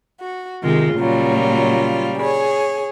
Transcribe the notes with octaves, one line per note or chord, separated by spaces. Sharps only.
F#4
C3 D#3 G#3 F4
A#2 C#3 F#3 G3 F4
G#4 C#5